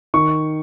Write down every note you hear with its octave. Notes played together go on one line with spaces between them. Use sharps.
D#3 C#6